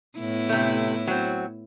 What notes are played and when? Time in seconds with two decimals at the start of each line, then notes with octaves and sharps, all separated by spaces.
0.19 A2 B3 E4
0.49 C3 A3
1.07 F#3 C4